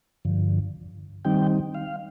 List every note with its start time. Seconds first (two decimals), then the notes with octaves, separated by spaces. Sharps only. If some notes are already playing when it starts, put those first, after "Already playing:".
0.25 G2 D3 F3
1.25 D#3 G3 C4 D#4 G5
1.75 F5